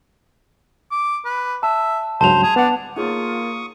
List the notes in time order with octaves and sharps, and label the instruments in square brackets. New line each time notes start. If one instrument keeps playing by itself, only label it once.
[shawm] D6
B4
[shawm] E5 [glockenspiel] A5
[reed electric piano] C#2 G2 F#3 [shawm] C5 [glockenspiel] A5 F7
[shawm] G#4
[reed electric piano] B3 F#5 [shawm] D4
[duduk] A#3 [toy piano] D#4 G#4 C#5 [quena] F4 [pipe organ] C#6 D#6